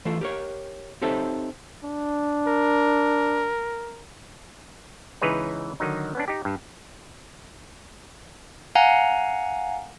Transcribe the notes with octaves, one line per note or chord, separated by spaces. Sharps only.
E3 A3 F4 A4
G4 A#4 C#5
C4 D#4 G4 A4 C#5 E5
D4
A#4
C#2 E3 D#4 G#4 B4 C#5
D3 D#3 F#3 D#4
B3 C#4 D4
D#4 G4
G2
F5 F#5 G#5 A#5